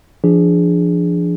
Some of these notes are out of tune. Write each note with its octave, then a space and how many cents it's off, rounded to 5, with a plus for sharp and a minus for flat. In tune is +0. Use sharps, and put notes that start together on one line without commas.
F3 -30 D4 -5 G#4 +0